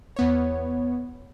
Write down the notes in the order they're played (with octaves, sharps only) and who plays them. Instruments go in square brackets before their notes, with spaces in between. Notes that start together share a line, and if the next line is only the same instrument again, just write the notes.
[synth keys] E2 B3 C#5